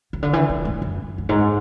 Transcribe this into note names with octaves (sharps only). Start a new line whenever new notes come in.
C#3
D3
E3
E3
A2
F#2
F#2
G#2